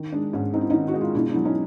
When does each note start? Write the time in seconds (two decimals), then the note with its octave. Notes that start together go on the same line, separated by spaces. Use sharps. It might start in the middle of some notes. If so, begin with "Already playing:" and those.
Already playing: D#3
0.12 G#3 D4
0.33 G#2 C#4
0.53 C4 D#4
0.61 E4
0.70 D#3 C#4 D#4
0.88 F#4
0.94 G#3
1.01 F4
1.15 B2 D4 E4
1.30 D4 E4
1.36 F#3
1.45 C#4 D#4